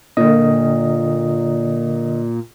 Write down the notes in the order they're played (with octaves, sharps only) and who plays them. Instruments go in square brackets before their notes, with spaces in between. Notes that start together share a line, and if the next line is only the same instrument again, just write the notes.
[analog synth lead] A#2 [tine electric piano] D3 D#5